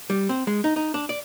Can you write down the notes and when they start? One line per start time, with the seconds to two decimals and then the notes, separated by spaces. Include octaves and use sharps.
0.10 G3
0.29 C4
0.47 G#3
0.64 D#4
0.76 D#4
0.94 D4
1.09 D5